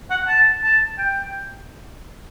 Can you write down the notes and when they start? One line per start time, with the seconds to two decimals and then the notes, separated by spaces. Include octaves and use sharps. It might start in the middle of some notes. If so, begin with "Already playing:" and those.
0.10 F#5
0.28 A5
0.63 A5
0.98 G5